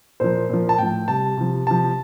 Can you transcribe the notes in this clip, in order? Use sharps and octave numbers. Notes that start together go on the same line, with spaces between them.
A#2 F3 C5
A#2 F3
A5
A2 F3 G5
C3 G3 A5
C3 F3
C3 F3 A5